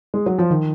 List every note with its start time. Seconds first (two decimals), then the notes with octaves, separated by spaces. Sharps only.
0.14 G#3
0.26 F#3
0.38 F3
0.50 D#3